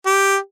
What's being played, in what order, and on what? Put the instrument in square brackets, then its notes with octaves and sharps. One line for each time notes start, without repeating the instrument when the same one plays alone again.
[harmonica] G4